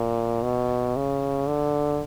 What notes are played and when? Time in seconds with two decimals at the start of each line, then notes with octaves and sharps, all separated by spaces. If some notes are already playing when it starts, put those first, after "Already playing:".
Already playing: A#2
0.43 B2
0.96 C#3
1.47 D3